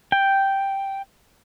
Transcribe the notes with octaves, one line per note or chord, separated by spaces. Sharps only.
G5